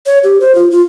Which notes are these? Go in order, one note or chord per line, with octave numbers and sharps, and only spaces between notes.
C#5
G4
C5
F4
F4